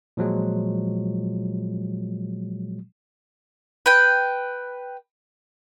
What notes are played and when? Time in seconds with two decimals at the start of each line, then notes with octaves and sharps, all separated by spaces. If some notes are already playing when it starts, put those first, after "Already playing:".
0.17 A#2 F3 F#3 G#3
3.86 B4 G5